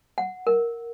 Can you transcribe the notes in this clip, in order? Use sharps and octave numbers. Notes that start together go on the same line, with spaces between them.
F#5
A#4